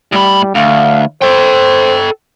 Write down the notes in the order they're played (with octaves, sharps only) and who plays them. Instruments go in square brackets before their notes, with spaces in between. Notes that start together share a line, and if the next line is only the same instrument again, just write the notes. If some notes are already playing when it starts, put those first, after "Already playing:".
[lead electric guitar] A2 B5 [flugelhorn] G3
[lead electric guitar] D2 [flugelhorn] F5
[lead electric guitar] A4 G5 [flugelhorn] C5